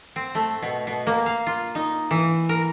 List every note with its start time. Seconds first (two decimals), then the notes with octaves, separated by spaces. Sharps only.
0.16 C4
0.35 A3
0.62 B2
0.87 B2
1.07 A#3
1.26 F5
1.47 F4
1.75 D#4
2.11 E3
2.49 A#4